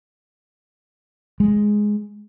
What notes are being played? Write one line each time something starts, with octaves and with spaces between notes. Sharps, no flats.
G#3